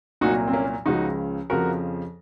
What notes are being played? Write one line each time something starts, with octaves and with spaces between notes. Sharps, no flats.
C2 A#2 F#3 D#4 F#4
C4
A#3 C#4
C#2 C#3 F3 D#4 F#4
F2 C#3 F3 F#4 A#4